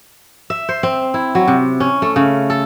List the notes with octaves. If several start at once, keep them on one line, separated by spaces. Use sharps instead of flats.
E5
C5
C4
E4
F#3
C3
C#4
A3
C#3
A4